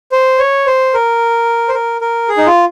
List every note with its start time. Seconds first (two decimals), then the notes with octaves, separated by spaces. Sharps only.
0.12 C5
0.39 C#5
0.67 C5
0.94 A#4
1.69 C5
1.74 A#4
2.01 A#4
2.29 G#4
2.37 D#4
2.46 F4